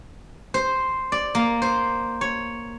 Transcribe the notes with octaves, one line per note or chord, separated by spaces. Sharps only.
C5
D5
A#3
C5
C#5